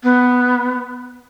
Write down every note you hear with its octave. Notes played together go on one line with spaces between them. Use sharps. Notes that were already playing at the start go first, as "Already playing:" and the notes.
B3